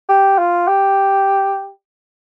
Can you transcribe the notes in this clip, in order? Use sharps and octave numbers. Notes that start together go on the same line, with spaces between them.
G4
F4
G4